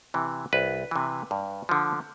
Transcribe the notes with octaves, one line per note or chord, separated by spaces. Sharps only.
C3 E3
C2 B4
C3 E3
G2
D3 F3